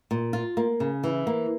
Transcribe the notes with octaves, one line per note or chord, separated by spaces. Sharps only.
A#2
F4
A#3
C#3
E3
A#3